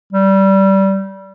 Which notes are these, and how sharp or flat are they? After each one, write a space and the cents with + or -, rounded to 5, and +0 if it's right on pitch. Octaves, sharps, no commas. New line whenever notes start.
G3 -20